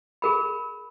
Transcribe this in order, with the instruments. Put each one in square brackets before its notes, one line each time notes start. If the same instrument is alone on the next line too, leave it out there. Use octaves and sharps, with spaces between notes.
[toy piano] G#4 A#4 B5